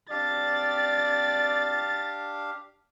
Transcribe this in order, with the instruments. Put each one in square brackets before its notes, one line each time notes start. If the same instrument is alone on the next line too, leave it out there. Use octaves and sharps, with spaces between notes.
[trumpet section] C4 D5 [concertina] D4 G4 F5 [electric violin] A6